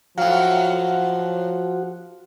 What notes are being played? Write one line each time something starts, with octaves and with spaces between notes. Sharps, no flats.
A2 F3 F#3 F#4 F5 F#5